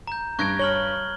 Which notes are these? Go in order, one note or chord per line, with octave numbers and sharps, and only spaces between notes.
A#5 G6
G2 C#6 F#6 G#6 A#6 D7
C#5 F6 F#7 G7